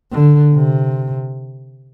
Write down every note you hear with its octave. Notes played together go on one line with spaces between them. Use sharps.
D3
C3